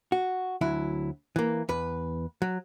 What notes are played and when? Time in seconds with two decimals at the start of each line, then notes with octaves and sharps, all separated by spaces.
0.12 F#4
0.61 D2 F#3 E4
1.36 E3 A#3
1.69 E2 B4
2.42 F#3